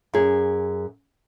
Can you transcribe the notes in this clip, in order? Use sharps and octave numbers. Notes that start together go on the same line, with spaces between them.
F#2 G#4